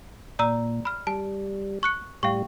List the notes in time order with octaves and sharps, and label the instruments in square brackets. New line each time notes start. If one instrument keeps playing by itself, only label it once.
[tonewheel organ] A#2 [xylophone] D5 A#5 E6
[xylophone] B5 F6
[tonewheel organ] G3 [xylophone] A5
[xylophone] C#6 F#6 C#7
[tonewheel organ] A2 G3 [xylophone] F5 G5 C#6